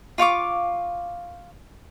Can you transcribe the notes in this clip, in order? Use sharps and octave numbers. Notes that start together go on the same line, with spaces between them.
F4 F5 C#6 D6